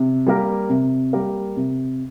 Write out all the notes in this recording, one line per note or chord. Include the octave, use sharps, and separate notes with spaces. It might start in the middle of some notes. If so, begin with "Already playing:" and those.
Already playing: C3
G3 A#3 G4 A#4
C3
G3 A#3 G4 A#4
C3